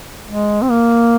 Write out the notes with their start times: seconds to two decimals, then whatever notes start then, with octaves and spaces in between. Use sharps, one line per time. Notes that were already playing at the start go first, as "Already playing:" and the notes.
0.27 G#3
0.62 C4
0.71 A#3